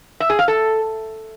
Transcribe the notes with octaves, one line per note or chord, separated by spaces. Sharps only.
E5
G#4
F5
A4